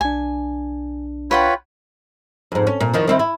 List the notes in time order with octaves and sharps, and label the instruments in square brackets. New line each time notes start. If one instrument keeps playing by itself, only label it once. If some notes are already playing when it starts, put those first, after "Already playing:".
[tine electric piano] B1 D4 [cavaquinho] G#5
[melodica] F4 C#5 B5 [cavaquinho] B4 F#5 G5
[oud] F2 G#2
C#4
A#2
E2 D#3 F3
D#3 C4 E4
E4